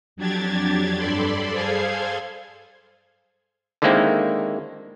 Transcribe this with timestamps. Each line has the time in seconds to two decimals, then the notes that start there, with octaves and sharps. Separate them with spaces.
0.16 F2 F#3 D4 G4 G#6 A6
0.96 G2 A4 D5 B5 C6
1.50 G#4 A4 C5 F5 C6 G#6
3.82 D3 D#3 G#3 A#3 C4 E4